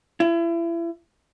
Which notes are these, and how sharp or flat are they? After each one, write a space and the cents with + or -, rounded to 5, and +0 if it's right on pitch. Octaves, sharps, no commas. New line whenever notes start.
E4 +35